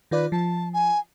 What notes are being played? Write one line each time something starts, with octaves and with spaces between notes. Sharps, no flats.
D#3 F4 B4 D5
F3 A5
G#5